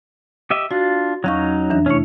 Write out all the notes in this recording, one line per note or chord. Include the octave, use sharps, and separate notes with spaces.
G4 D#5 E5
D4 F4 F#4
E2 F#3 C#4 D#4 F5 C#6
F2 E3 D4
C3 A3 C#4 E4 C#5